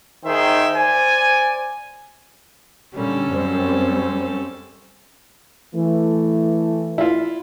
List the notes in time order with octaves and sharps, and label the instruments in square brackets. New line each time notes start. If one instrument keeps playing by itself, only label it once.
[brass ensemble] D#3 G#4 C5 E5 G5
C5 D5 G#5
[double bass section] A#2 D3 G3 [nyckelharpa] C#4 A4
[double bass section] F#2 G3 C4
[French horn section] E3 A3
[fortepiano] E4 F4